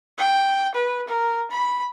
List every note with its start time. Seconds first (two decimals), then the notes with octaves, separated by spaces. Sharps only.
0.18 G5
0.75 B4
1.08 A#4
1.51 B5